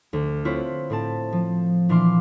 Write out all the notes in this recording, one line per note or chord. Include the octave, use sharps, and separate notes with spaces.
D2
C4 E4 F4 B4 C#5
A2 C4 A5
F3
A#2 E3 D4 F5 C6 D6